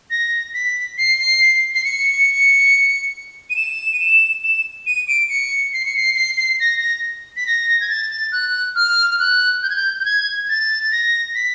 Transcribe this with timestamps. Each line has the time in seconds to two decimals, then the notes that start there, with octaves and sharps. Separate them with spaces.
0.10 A#6
0.54 B6
0.98 C7
1.74 C7
1.84 C#7
3.50 D#7
3.56 E7
3.93 D#7
4.00 E7
4.44 E7
4.86 D#7
5.08 D7
5.29 C#7
5.73 C7
5.85 C#7
5.96 C7
6.16 C7
6.37 C7
6.60 A#6
6.81 A#6
7.36 B6
7.47 A#6
7.81 G#6
7.89 A6
8.32 F#6
8.75 F6
9.10 F6
9.19 F#6
9.63 G6
9.70 G#6
9.76 G6
10.00 G6
10.05 G#6
10.49 A6
10.92 A#6
11.35 B6